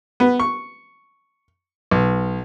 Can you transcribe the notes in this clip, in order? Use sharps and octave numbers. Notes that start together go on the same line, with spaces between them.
B3
C#6
B1